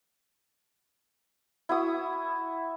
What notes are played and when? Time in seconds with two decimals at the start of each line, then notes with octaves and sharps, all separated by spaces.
1.69 E4 F#4 D#6